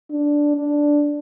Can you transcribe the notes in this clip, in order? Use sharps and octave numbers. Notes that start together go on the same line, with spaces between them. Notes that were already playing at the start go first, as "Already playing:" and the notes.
D4
D4